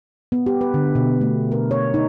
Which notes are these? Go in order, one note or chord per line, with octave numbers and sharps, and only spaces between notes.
B3
G4
B4
D3
B2
A3
A#4
C#5
D#4